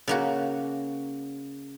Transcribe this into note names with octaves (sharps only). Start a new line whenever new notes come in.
C#3 A#3 F#4